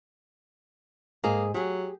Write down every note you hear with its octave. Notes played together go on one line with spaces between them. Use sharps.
G#2 A#3 G#4
F#3 G4 G#4